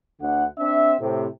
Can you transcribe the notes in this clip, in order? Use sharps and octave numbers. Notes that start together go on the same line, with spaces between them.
D2 D3 F#5
C4 D4 E5
A2 C3